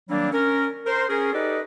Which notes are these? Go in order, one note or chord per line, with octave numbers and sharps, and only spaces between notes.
D#3 F#3 G3 A#3 C4 D4
C#4 A#4
A#4 C5
C#4 G#4 A#4
D#4 G4 A4 B4 D5 D#5